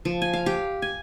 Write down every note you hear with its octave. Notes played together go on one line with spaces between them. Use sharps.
F3
G#5
F5
G4
G#5